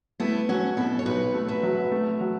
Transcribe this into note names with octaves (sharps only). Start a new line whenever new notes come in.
A3 B3 E4
F#3 C#4 F#4
B2 E4 A4
C#5
B1 F#4 B4
A3
B4 E5
F#3
A3
F#3